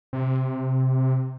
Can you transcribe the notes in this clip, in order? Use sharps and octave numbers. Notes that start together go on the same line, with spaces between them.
C3